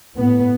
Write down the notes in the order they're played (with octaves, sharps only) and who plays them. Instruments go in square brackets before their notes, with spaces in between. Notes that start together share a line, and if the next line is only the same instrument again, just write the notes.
[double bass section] A2 B3